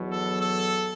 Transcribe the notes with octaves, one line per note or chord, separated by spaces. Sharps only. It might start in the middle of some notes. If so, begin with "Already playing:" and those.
Already playing: E2 B2 F#3
A4
A4